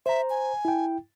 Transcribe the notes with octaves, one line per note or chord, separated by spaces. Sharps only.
C5 E5 A#5
G#5
E4 G5